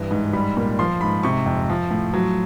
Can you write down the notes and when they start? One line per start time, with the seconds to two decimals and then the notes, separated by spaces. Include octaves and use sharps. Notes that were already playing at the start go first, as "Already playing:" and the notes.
Already playing: G2 E3
0.11 G#2
0.33 G3 B5
0.57 A#2
0.79 F3 C6
1.01 G#2 B5
1.23 C3 C#6
1.46 F2
1.69 F3
1.91 A2
2.14 F#3